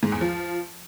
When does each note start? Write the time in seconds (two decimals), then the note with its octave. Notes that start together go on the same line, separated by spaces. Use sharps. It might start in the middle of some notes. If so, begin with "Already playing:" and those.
0.03 G#2
0.12 E2
0.21 F3